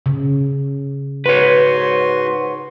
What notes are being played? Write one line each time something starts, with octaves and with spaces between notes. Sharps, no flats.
C#3
G#2 F#4 B4 C#5 C6